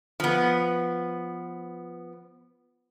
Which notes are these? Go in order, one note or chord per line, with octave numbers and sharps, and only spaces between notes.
F3 B3